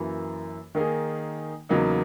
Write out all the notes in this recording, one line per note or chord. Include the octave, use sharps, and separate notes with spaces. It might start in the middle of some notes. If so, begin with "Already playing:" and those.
Already playing: F#2 E3 A#3
D#3 A#3 D#4 G#4
E2 C#3 F#3 A#3 D#4